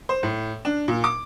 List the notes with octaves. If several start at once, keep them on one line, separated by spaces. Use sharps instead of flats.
C5
A2
D4
A#2
D6